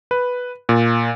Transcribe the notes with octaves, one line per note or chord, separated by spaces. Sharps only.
B4
A#2